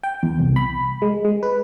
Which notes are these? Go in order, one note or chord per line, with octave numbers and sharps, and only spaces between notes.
G5
E2
C2
B5
G#3
G#3
B4